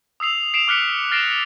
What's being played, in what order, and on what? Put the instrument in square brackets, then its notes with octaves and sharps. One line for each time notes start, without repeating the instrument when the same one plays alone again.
[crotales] D#6 E6 C7 F7
C7 D7 E7 F7
D6 F6 F#6 B6 C#7 D7
F6 A6 A#6 C7 D7 E7